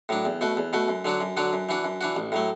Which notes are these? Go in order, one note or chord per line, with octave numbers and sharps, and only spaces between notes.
A2 F#3 D4
E2
B2 A3 F#4
E2
B2 A3 F#4
F#2
D3 F#3 D4 F#4
F#2
D3 F#3 D4 F#4
F#2
E3 D4 F#4
F#2
E3 D4 F#4
A1
A2 F#3 A3